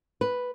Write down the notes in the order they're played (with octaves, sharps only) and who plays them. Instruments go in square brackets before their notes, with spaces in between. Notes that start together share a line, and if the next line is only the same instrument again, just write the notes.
[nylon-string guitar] B4